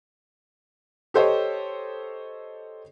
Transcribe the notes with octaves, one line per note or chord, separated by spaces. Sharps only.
G4 A4 C5 C#5 D#5